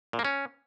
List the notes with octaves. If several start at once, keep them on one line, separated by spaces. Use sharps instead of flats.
A#2
A#3
C#4